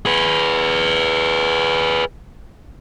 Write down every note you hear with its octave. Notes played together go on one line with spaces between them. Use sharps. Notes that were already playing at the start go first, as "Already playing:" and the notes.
G#4 B4